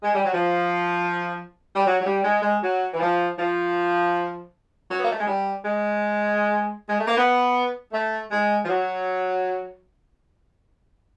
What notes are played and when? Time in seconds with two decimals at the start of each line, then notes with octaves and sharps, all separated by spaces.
0.03 G#3
0.14 G3
0.24 F#3
0.34 F3
1.74 G3
1.85 F#3
2.00 F#3
2.05 G3
2.24 G#3
2.42 G#3
2.62 F#3
2.93 E3
3.00 F3
3.37 F3
4.89 F#3
4.98 B3
5.05 A#3
5.12 A3
5.20 G#3
5.26 G3
5.64 G#3
6.89 G#3
6.98 A3
7.07 A#3
7.17 B3
7.92 A3
8.30 G#3
8.64 F3
8.68 F#3